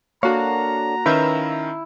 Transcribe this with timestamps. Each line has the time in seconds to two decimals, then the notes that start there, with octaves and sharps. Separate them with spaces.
0.23 A#3 D4 F#4 A4 C#5 F5 A#5
1.06 D#3 C#4 E4 B4 E5 F5 G6